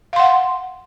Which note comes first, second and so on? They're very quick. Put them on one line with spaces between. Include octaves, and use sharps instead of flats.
F5 C6 F#5